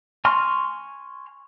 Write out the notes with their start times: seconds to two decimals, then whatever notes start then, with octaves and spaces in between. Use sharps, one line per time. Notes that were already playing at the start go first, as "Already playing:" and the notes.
0.25 G#5 C6 C#6 F6